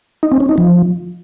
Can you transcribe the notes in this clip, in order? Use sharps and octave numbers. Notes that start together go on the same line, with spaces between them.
D#4
C4
C#4
D#4
F3